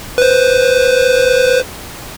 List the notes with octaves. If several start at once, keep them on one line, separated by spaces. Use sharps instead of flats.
B4 C5